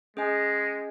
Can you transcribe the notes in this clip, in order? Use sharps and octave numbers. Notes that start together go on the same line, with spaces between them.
G#3 C#4 G#4 D#5 G#5